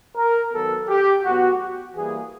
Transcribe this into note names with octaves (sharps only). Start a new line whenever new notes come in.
A#4
D#3 F#3 B3 A4
G4
A2 F#3 B3 F#4
E3 G3 A#3 G#4